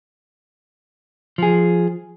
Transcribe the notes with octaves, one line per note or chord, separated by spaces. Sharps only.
F3 G#4